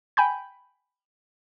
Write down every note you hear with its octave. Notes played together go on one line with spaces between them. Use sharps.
G5 G#5 B5 G6